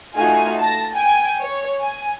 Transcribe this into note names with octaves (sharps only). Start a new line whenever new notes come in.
A3 D#4 F4 F#4 G#5
A5 A#6
G5 G#5
C#5
G#5